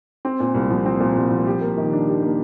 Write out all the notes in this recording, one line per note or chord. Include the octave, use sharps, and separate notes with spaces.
C4
A#2
C2
F3
C4
A#2
C2
F3
G4
A#3
D#3
D4
G4
A#3